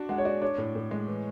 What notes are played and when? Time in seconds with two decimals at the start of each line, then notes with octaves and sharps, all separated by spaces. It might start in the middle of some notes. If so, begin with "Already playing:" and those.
Already playing: D4 F#4 A5
0.09 G#3 F#5
0.18 C#5
0.25 F#4 D5
0.42 D4 C#5
0.58 A2
0.75 A2
0.91 G#3
1.08 E3